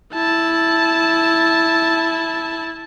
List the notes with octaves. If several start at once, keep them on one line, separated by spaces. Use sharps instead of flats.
E4 A5